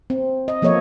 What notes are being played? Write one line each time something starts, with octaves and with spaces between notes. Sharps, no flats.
C4
D#5
F3 A#3 A4 C#5 D#5 E5